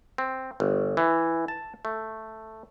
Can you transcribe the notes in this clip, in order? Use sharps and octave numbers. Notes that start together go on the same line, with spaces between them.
C4
G1
E3
A5
A3